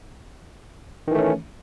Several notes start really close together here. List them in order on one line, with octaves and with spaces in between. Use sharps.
D#3 E3 A3 C#4